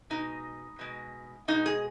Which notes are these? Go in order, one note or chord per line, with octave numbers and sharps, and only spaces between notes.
B2 G#3 D#4
B2 G#3
B2 G#3 D#4
G#4